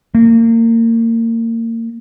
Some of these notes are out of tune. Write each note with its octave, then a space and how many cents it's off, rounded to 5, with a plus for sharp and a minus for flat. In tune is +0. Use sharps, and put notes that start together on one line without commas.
A#3 -30